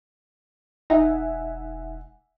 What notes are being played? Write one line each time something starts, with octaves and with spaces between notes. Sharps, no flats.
E1 D#4 E5 F#5 G#5